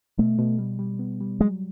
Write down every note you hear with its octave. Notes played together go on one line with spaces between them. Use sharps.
B2 A3
B2
G3
G3
B3
G3
F#3 G#3